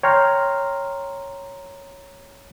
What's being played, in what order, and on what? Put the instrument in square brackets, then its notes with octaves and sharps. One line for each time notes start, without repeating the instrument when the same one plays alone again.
[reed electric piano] C#5 G5 A#5 C6 F6